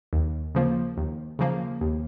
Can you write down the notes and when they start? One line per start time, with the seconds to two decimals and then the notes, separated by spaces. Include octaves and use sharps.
0.13 D#2
0.55 C#3 F3 A#3
0.97 D#2
1.39 C#3 F3 A#3
1.81 D#2